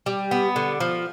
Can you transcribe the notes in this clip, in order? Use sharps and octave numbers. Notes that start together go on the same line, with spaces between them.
G3
B3
D3
F3